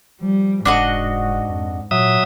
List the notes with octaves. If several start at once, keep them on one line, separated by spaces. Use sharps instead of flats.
F3 G3
F1 G#2 D4 F#4 D#5
F2
A#2 F#3 E5 D#6